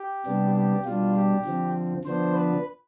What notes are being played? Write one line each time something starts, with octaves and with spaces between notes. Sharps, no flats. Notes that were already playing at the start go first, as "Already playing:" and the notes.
Already playing: G4
C3 G3 B3 D4
G4
B2 G3 D4 F4
G4
D3 F3 C4
D3 F3 B3 D4 C5
B4